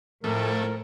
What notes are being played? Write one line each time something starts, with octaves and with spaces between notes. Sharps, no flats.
F2 A2 A3 A#4